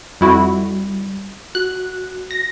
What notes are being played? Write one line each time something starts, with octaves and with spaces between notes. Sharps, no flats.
F2 G3 E4 F#4
F#4 F#6
A#6